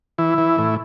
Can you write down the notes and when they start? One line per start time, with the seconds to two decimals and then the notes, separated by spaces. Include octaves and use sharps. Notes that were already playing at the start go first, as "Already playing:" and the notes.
0.18 E3 E4
0.38 E3
0.58 A2